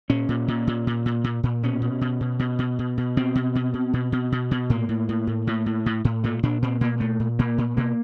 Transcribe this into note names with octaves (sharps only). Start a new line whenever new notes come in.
A#2 C#4
A#2
A#2
A#2
A#2
A#2
A#2
A#2
B2 C#4
B2
B2
B2
B2
B2
B2
B2
B2 C4
B2
B2
B2
B2
B2
B2
B2
A2 A#3
A2
A2
A2
A2
A2
A2
A2
A#2 A3
A#2 D4
A#2 C4
A#2 A#3
A#2 A3
A#2
A#2 A#3
A#2
B2 A#3